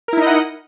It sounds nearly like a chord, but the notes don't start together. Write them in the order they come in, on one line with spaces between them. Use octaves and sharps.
A#4 E4 D#4 D#5 F#5